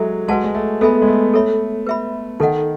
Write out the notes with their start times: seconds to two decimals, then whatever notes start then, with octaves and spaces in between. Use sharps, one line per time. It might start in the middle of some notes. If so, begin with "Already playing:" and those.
Already playing: F#3 G#3 E4 A4 E5
0.28 G#3 F#4 B4 F#5 A5
0.44 G#3
0.55 A3
0.81 B3 A4 E5 G#5 B5
1.02 G#3
1.08 A3
1.34 A4 C#5 E5 B5
1.87 B4 E5 B5
2.40 D#3 D#4 A4 D#5 F#5